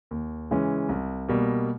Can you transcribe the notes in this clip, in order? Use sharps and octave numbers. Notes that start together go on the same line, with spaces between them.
D#2
C#3 E3 G#3 C#4
C2
B2 G3 A#3